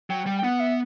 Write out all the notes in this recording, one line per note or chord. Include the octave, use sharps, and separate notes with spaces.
F#3 G5
G3 G5
G5
B3 F#5
E5